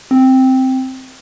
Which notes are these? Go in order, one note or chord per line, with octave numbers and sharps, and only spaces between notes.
C4